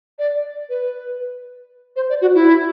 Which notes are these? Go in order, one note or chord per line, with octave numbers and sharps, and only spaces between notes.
D5
B4
C5
D5
F#4
E4